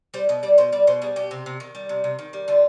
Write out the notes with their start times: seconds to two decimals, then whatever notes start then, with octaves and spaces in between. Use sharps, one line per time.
0.14 G3 C5
0.29 B2 D#5
0.43 G3 D5
0.58 B2 C5
0.72 G3 D5
0.87 B2 C5
1.02 G3 G#4
1.16 B2 G4
1.31 C3
1.46 C3
1.60 D#3
1.75 G3
1.89 C3
2.04 C3
2.19 D#3
2.33 G3
2.48 D3 F4